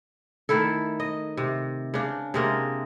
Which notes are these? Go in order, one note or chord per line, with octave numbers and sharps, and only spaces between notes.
D#3 A3 E4 A4
D#5
C3
C#3 D4
C3 G#3 A#3